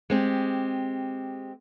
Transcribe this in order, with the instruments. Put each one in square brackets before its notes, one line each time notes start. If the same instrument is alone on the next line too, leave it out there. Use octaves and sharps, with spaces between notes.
[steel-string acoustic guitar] G#3 C4 G4